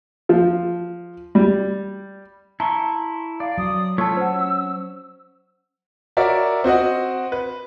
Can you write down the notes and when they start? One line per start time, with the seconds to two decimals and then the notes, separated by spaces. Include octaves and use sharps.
0.29 F3
1.35 G3
2.60 E4 A5 A#5 C6 C#6
3.40 D5 F5
3.58 F#3 D#6
3.98 A3 F4 C#5 A5 C#6 E6
4.17 C#4 C5 F#5
6.17 F#4 A#4 C#5 D5 E5
6.64 C4 F#4 D#5 F#5
7.32 B4